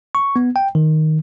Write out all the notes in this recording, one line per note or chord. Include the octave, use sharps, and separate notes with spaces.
C#6
B3
G5
D#3